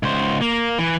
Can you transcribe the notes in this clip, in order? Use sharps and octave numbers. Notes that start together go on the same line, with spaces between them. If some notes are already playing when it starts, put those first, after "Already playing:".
C#2 C5
A#3
E3